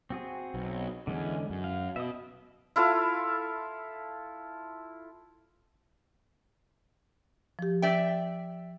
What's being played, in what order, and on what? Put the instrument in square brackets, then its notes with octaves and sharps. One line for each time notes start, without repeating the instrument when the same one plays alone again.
[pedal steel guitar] C4 F#4 G#4
[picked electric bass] B1
[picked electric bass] E2 [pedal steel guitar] D3 G#3 C#4
[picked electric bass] F#2
[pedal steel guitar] F5
[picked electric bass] B2 [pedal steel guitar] E5 D#6
[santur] E4 F4 A4 F5
[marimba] F3 G4
[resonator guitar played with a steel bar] D5 E5 G5